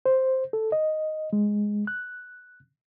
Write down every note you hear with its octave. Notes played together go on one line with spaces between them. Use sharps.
C5
A4
D#5
G#3
F#6